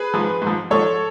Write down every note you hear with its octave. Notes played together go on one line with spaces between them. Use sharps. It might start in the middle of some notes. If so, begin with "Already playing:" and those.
Already playing: G#4 B4
G#2 F3
G#2
F3
G#2 F3 A4 C#5